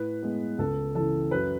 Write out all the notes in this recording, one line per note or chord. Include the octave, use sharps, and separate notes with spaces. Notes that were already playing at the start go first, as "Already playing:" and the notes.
Already playing: A2 B4
G#3 B3
C#2 A4
C#3 E3 A4
F#2 B4